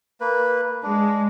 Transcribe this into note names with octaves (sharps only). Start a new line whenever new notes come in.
A#3 B4
G#3 D4